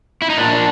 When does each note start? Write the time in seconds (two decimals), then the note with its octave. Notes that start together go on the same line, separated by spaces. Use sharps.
0.22 E4
0.30 D#4
0.38 A#2 D4